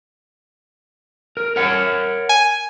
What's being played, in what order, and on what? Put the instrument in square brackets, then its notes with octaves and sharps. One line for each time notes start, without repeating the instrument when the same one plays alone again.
[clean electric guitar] A#4
A#4 C#5 F#5
[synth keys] G#5